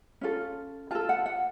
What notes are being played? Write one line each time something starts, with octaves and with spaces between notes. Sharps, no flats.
C#4 F4 A4
F4 A4 A5
F#5
F#5